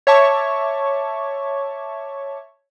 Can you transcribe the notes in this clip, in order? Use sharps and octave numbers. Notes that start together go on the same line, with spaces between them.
C#5 E5 A5 C#6 D6